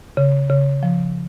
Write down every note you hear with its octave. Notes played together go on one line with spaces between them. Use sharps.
C#3
C#3
F3